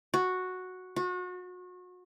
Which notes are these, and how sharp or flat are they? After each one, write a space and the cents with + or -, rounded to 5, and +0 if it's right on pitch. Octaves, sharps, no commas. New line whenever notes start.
F#4 -5
F#4 -35